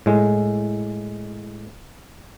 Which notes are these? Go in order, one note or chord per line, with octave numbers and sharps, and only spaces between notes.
A2 G#3